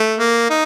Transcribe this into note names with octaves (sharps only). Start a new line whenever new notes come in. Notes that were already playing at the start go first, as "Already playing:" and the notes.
Already playing: A3
A#3
D#4